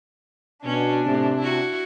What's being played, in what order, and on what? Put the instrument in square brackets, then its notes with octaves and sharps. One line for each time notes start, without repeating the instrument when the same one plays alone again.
[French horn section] B2 [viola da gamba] C#4 [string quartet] D4
[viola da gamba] A2 [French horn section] C3
[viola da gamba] E4 F#4